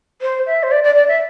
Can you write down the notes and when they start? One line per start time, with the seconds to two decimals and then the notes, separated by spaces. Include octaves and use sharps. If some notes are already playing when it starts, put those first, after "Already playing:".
0.22 C5
0.47 E5
0.63 C5
0.71 D5
0.84 D5
0.95 D5
1.08 E5